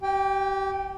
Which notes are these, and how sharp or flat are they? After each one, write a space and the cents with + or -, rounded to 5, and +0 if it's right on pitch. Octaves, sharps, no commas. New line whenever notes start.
G4 -25 G5 +15